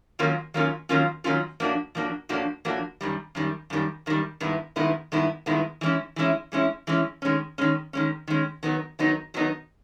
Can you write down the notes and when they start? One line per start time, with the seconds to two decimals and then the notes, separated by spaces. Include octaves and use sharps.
0.19 D#3 F#3 A#3 C#4 F4
0.54 D#3 F#3 A#3 C#4 F4
0.89 D#3 F#3 A#3 C#4 F4
1.24 D#3 F#3 A#3 C#4 F4
1.60 A2 F3 A#3 D4 F#4
1.95 A2 F3 A#3 D4 F#4
2.29 A2 F3 A#3 D4 F#4
2.65 A2 F3 A#3 D4 F#4
3.01 F#2 D#3 G3
3.35 F#2 D#3 G3
3.70 F#2 D#3 G3
4.06 F#2 D#3 G3
4.40 G2 D#3 G#3 B3 E4
4.76 G2 D#3 G#3 B3 E4
5.12 G2 D#3 G#3 B3 E4
5.46 G2 D#3 G#3 B3 E4
5.81 E3 G#3 C#4 E4
6.16 E3 G#3 C#4 E4
6.52 E3 G#3 C#4 E4
6.87 E3 G#3 C#4 E4
7.22 D#3 G#3 C#4
7.58 D#3 G#3 C#4
7.93 D#3 G#3 C#4
8.27 D#3 G#3 C#4
8.63 D#3 F#3 B3 D#4
8.99 D#3 F#3 B3 D#4
9.34 D#3 F#3 B3 D#4